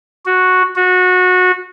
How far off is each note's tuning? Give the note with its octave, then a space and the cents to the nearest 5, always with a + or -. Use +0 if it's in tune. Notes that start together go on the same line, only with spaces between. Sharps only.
F#4 -5
F#4 -20